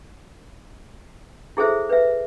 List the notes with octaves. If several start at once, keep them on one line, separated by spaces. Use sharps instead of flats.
E4 G#4 A4 C5 E5
B4 E5